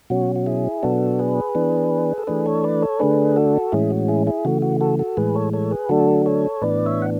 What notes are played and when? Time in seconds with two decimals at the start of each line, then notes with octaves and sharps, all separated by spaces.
0.10 B2 F#3 C#4 F#4
0.36 F#4
0.46 E4 G#4
0.83 B2 F#3 B3 D4 F#4 A4
1.19 G#4 B4
1.55 E3 B3 D4
2.18 A4
2.27 E3 A3 D4 G#4 B4
2.46 A4 C#5
2.64 B4 D5
2.82 A4 C#5
2.99 D3 A3 D4 G#4 B4
3.36 F#4 A4
3.72 A2 E3 G#3 C#4 E4 G#4
3.91 F#4
4.08 E4 G#4
4.27 E4 G#4
4.45 C#3 E3 A3 F#4
4.62 F#4
4.81 F#4 A4
4.99 F#4 A4
5.17 A2 E3 G#3 G#4 B4
5.35 A4 C#5
5.53 A4 C#5
5.71 G#4 B4
5.89 D3 F#3 A3 D4 F#4 A4
6.26 A4 C#5
6.62 A2 E3 B3 D4 B4 D5
6.86 C#5 E5
7.02 F#5